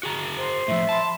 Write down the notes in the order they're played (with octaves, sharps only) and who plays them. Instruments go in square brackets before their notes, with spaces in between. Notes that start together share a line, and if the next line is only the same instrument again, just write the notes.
[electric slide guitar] F#4 G#4 A#5
[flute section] C5
[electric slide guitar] A2 F3 [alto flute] E5
[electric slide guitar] A5 [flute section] B5 C6